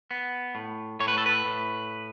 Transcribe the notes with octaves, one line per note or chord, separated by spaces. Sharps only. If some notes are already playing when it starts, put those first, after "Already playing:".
B3
A2
A2 C#5
B4
A4
B4
A2